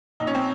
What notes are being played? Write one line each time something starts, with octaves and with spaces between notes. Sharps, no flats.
A#1 D#4
C#4
C4